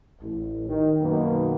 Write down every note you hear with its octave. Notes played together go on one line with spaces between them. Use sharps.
A1
D#3
F#2 B2 D#3 A#3 B3